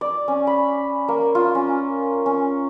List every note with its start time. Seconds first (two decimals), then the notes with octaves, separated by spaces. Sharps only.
0.01 D5
0.28 C#4
0.47 B5
1.08 A#3
1.35 F4
1.55 C#4
2.26 C#4